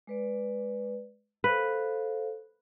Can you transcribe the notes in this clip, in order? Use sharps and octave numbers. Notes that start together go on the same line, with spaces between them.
G#3 B4 D5
A4 B4 C5 F5